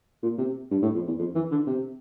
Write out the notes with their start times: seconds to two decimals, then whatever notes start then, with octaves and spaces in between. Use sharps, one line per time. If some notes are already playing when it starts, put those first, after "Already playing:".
0.23 A#2
0.38 C3
0.71 G2
0.83 A2
0.95 F2
1.07 E2
1.19 F2
1.35 E3
1.51 D3
1.67 C3